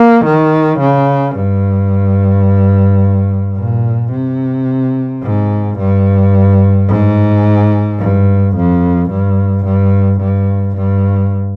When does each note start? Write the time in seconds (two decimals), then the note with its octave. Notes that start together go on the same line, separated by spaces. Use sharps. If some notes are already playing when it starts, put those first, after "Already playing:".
Already playing: A#3
0.25 D#3
0.79 C#3
1.35 G2
3.57 A#2
4.12 C3
5.23 G#2
5.78 G2
6.88 G#2
7.99 G2
8.55 F2
9.10 G2
9.65 G2
10.20 G2
10.76 G2